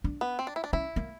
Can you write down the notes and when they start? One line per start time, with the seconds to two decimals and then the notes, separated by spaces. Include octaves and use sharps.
0.04 D4
0.21 B3
0.39 C4
0.47 D4
0.56 E4
0.64 D4
0.73 C#4 E4
0.96 A#3